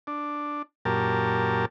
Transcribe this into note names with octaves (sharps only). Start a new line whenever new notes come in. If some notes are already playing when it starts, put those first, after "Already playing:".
D4
F#2 A#2 G4 A#4 A5